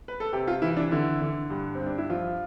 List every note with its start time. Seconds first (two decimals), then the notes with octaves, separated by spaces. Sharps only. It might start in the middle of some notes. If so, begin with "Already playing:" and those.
0.08 B4
0.20 A4
0.33 C3 G4
0.47 F4
0.62 E3 E4
0.77 D4
0.91 D3 E4
1.21 D3
1.50 G2
1.75 C4
1.81 G2
1.86 D4
1.98 E4
2.09 F3 F4